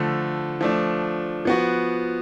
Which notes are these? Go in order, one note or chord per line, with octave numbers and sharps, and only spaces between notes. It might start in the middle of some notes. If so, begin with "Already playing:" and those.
Already playing: D3 F3 A3
F3 A3 D4
F3 B3 F#4